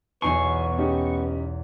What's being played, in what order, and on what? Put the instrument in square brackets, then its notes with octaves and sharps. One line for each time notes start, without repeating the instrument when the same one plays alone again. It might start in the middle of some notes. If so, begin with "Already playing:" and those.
[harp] B1 E2 C7 [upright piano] B2 D#4 G#5 [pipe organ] B3 [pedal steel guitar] C#6
[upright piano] C#4 D#4 G4